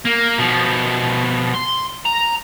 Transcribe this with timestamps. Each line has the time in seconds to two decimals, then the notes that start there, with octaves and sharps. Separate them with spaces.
0.05 A#3
0.38 B2 F3
1.55 C6
2.06 A#5